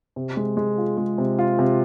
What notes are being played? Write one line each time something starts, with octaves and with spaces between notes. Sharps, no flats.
C3
G#3
G#3
F4
G#3
C3
F4
C3